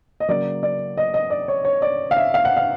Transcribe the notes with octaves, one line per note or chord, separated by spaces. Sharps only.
D#5
C#3 F#3 A#3 D5
D5
D#5
D#5
D5
C#5
C#5
D5
F5
E5
F5
F#5
F5